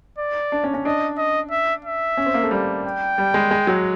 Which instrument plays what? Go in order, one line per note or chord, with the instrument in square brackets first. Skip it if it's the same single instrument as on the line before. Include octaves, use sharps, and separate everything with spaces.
[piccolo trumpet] D5
[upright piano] D4
C#4
C#4
[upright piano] D4 [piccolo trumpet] D#5
[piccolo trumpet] D#5
E5
E5
[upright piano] C#4
C4
A#3
A3
G3
[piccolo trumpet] G5
[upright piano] G3
G#3
G#3
F#3